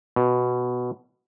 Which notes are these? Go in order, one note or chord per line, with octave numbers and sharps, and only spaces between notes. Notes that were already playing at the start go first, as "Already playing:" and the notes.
B2